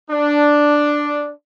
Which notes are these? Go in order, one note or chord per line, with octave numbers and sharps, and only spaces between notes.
D4